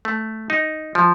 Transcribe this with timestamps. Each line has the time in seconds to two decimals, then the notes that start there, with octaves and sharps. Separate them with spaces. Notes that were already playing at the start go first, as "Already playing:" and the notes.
0.05 A3
0.50 D#4
0.95 F3